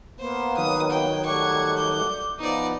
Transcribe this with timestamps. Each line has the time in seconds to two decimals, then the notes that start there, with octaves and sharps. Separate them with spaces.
0.20 A#3 B3 C5
0.57 D#3 F#3 D#6
0.90 C#5 G5
1.25 G3 A3 F#5 C#6 D6 G#6
1.77 G6
2.39 F3 B3 D#4 D5